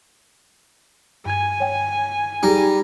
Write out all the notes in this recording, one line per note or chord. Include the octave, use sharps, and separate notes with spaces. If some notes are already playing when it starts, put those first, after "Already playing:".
G2 G#5 G#6
C#5 G5
G3 D#4 G#4 A#4